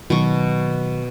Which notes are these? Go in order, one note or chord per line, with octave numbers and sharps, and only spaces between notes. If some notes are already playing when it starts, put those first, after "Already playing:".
B2 D#3 F#3 C#6